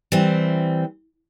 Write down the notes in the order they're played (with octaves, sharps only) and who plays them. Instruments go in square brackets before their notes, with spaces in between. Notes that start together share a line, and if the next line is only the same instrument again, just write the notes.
[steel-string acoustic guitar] E3 G3 C4